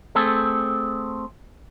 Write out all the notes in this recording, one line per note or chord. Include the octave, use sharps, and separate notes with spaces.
A3 C4 G#4 A4